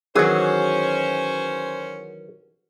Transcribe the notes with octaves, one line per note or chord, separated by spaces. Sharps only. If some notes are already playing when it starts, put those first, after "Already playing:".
D#3 E3 F#3 C#4 F#4 G#4 C5